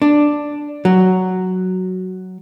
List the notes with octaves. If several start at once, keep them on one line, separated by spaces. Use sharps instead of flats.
D4
F#3